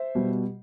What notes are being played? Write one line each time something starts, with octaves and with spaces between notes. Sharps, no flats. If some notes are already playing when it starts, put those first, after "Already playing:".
Already playing: C5 E5
B2 G3